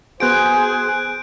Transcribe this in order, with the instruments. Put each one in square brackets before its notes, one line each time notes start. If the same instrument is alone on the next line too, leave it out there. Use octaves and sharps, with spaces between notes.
[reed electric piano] B3 F#4 [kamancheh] G#4 [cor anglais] C5 [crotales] F#6 G6 D7